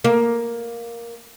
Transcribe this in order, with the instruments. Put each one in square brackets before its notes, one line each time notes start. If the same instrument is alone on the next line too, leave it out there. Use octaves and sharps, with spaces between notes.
[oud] A#3